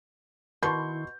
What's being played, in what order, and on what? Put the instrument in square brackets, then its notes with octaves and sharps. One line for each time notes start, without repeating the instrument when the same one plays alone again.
[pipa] B2 [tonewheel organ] D#3 E4 [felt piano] C6 C#6 G6